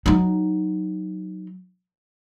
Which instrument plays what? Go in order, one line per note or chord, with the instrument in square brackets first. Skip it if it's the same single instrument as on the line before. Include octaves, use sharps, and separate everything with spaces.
[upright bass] F#3 D#4